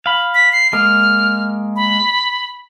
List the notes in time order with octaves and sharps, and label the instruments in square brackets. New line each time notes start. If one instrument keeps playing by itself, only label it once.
[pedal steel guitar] F5 B5
[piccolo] B6
C7
[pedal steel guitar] G#3 A#3 [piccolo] F6
[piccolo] B5